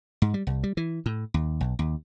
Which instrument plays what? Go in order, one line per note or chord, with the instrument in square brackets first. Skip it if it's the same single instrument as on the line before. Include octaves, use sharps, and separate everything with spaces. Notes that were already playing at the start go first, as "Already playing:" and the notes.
[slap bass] G#2
G3
C2
G3
E3
A2
D#2
B1
D#2